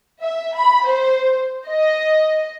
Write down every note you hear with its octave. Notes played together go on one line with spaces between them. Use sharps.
E5
B5
C5
D#5